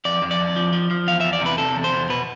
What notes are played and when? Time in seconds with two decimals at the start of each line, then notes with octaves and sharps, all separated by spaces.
0.05 F2 D5
0.22 F2
0.31 D5
0.39 F2
0.56 F3
0.73 F3
0.91 F3
1.07 E2 F5
1.20 E5
1.24 E2
1.33 D5
1.41 C3 B4
1.58 C3 A4
1.76 E2
1.84 C5
1.93 E2
2.09 B2 B4